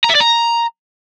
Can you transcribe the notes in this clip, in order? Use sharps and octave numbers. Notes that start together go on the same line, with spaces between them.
A#5
E5
D5
A#5